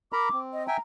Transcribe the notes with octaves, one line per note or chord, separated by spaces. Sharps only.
A#4 A#5 B5 D6
C4
D#5
E5 G5 G#5 A#5